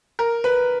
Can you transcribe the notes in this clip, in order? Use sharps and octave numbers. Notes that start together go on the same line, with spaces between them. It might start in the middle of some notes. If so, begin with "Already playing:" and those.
A#4
B4